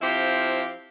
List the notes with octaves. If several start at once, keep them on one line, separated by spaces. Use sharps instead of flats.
F3 C4 E4 G4 C5 F5